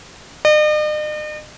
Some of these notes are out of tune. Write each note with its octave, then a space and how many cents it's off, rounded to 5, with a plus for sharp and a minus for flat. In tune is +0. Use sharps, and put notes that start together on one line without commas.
D#5 -45